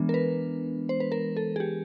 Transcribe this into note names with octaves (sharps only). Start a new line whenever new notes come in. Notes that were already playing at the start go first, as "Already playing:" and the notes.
Already playing: E3 G#3 B3 D4
A#4
B4
C5
B4
A#4
A4
G#4
G4